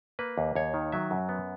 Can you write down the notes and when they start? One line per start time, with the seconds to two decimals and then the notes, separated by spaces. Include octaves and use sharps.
0.19 A#3 B4
0.38 D#2
0.55 D#2 C#5
0.74 D#3
0.92 F#3 E5
1.11 F#2
1.29 B3